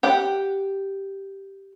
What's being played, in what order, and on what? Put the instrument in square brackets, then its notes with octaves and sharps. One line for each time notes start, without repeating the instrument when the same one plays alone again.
[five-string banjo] G4 F#5 G5